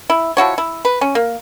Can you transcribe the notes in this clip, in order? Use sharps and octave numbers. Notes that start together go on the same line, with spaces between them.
E4
F3 E4 F#4 C#5
E4
B4
C#4
A#3